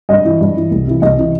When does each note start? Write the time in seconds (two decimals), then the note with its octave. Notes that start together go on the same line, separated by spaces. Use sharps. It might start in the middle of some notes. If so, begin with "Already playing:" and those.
0.09 G2 D#5
0.25 E3
0.41 G2
0.56 E3
0.71 C2
0.87 C3 E3
1.02 C2 D#5
1.17 C3 E3